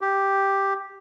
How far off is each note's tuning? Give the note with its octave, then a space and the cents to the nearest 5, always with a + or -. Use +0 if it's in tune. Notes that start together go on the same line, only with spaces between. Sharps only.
G4 +0